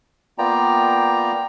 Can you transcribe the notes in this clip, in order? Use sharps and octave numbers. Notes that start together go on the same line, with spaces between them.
A#3 B3 F4 D5 G5 A#5